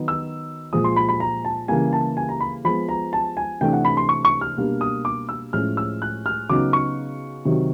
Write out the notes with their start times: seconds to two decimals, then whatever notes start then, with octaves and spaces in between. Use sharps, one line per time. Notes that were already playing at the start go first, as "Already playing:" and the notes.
Already playing: D#3 F#3 B3 D#4
0.08 E6
0.73 A#2 F3 G#3 D#6
0.84 C6
0.96 B5
1.09 B5
1.20 A#5
1.45 A5
1.68 C#3 E3 G3 A#3 G#5
1.93 A5
2.17 G#5
2.29 A#5
2.41 B5
2.64 F3 G#3 B3 B5
2.89 A#5
3.13 A5
3.37 G#5
3.61 C3 E3 A3 D4 G5
3.73 F#5
3.85 B5
3.97 C6
4.09 C#6
4.25 C#6
4.41 F6
4.57 B2 G3 A#3 D4
4.81 D#6
5.05 D6
5.29 E6
5.53 A2 F3 G#3 C#4 F6
5.77 E6
6.02 F#6
6.26 F6
6.50 C#3 F#3 B3 D#4 D6
6.73 C#6
7.45 C3 D#3 F#3